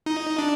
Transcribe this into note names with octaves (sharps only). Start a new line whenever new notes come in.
D#4
D4